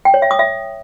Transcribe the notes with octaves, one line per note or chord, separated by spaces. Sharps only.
G5
C#5
E5
D#6
E5